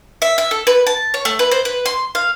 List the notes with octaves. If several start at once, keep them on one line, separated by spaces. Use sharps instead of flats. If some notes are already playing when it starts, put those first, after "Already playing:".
E5
E5
A4
B4
A5
C#5
A3
B4
C5
B4
C6
F5